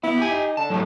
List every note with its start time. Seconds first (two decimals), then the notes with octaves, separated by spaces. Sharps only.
0.04 B3 E4
0.18 G4 G#5
0.31 D#4
0.57 D3 A5
0.70 A2 F#3 G3 A3